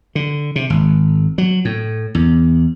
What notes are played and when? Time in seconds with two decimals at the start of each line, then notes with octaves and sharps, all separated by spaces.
0.15 D3
0.56 C3
0.70 G#1
1.38 F#3
1.65 A2
2.15 E2